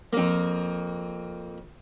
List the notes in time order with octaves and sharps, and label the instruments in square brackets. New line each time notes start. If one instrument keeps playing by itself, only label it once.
[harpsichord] F2 A#3